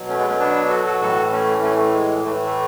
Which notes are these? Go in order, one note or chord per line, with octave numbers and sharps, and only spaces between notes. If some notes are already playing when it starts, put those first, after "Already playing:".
Already playing: B2 F#3
A3 C#4
G#3 B3
A3 C#4
B3 D4
F#4 A4
F#4 A4
A2 E3 F#4 A4
A3 C#4
A3 C#4
A3
G#3
A2 E3 A3
A3